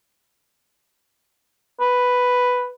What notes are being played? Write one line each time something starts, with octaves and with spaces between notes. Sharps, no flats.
B4